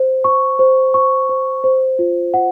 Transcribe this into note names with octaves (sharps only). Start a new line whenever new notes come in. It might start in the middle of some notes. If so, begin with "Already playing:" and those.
Already playing: C5
C#6
C5
C#6
C5
C5
F4
F#5